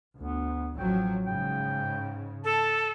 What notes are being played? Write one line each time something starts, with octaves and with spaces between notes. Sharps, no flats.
D2 B3
A1 F3 F#3 G5
G#2 C#3 G5
A4 A5